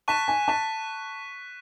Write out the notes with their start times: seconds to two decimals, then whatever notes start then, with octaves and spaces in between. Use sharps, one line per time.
0.08 A5 C#6 F#6 B6 E7
0.28 G#5
0.48 A5 C#6 F#6 B6 E7